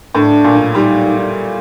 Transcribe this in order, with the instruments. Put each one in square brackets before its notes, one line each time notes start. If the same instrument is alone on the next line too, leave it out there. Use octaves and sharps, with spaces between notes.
[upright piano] A2 [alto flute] D4
[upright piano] A#2
[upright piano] G3 [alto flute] D#4